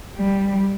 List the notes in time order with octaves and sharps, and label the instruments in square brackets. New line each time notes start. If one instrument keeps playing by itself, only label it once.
[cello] G3